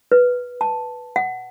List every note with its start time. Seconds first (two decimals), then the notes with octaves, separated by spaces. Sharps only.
0.12 B4
0.61 A5
1.16 F#5